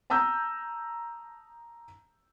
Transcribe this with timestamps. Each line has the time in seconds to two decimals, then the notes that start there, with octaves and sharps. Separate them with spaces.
0.10 A5 A#5 D#6 E6 G6